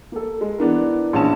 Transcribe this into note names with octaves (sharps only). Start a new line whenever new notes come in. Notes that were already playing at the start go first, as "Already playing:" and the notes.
A#3 A4
G#3
E3 B3 D4 A#4
A#1 E3 C#4 D4 A5 E7